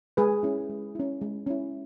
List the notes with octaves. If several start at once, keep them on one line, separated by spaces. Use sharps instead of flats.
G#3 G#4 B4
C#4 E4
G#3
C#4 E4
G#3
C#4 E4